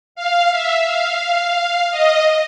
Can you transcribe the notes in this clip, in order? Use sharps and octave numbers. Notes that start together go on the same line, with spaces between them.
F5
E5
F5
D#5